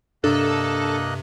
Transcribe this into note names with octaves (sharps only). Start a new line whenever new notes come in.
G2 C3 A#3 D4 A4 D#5 F#6